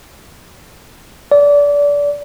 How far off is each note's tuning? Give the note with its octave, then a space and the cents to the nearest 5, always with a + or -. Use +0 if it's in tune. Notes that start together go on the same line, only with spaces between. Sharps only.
D5 -25